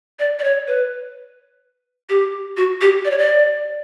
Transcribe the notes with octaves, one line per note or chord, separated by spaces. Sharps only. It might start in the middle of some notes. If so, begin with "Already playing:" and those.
D5
D5
C#5
B4
G4
F#4
G4
D5
C#5
D5